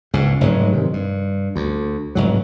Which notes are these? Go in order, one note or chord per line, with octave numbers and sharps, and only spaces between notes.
C#2 G#2
F1 G#2 F#3 G#3
C3 D#3
G2
D2
F1 G#2 F#3